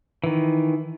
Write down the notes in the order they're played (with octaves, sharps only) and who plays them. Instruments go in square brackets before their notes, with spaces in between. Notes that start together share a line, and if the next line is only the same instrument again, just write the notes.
[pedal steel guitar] D#3 E3